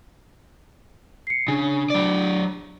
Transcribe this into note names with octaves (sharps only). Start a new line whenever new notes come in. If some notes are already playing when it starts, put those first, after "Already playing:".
C7 C#7
C#3 D4
F#3 D5